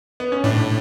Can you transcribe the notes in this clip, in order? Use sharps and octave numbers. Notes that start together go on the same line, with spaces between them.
B3
C#4
A2 D4